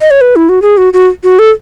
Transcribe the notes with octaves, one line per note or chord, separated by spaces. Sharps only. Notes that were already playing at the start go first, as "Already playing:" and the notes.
D#5
C#5
B4
E4
F#4
G#4
F#4
F#4
F#4
A4